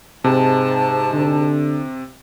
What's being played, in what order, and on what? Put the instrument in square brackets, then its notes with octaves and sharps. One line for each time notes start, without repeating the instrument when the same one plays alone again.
[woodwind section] G#2 A5 [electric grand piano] C3
[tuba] D3